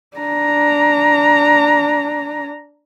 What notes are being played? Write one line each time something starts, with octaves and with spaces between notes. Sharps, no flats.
D4 A#5